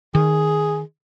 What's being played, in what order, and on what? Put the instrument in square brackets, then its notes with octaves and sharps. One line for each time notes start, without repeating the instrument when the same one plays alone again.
[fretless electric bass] D#3 [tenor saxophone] G#4